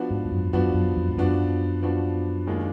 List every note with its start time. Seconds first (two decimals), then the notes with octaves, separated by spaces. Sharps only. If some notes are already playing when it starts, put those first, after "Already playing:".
Already playing: F3 B3 D4 F#4
0.10 G#2
0.25 F2
0.31 F#2
0.53 F#2 F3 B3 D4 F#4
0.74 F#2
0.97 F2
1.08 G#2
1.17 F#2 F3 B3 D4 F#4
1.82 F3 B3 D4 F#4
2.47 D#2 D#3 G#3 D4 F4